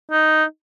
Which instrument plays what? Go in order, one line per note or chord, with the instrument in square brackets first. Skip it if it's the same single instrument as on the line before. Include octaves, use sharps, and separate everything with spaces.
[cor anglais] D#4